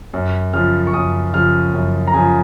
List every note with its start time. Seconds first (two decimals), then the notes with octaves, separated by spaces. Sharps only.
0.14 F#2
0.53 C#3 F3 F6
0.87 C#6
0.94 F#2 D#6
1.34 C#3 F3 F6
1.74 F#2
2.07 A#5
2.14 C#3 F3 G#5